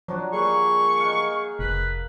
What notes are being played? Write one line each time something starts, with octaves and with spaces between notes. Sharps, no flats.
F3 F#3 D4 F#4
G3 A#3 G#4 C#6
D#5 F5 F#5
F1 B4